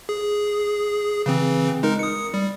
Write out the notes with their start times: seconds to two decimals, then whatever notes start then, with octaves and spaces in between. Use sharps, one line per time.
0.09 G#4
1.26 C#3 E3 C4
1.83 G#3 D#4 A#4
1.99 D#6 C#7
2.34 G3